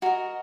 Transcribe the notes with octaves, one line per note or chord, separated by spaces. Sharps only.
F#4 A#4 D#5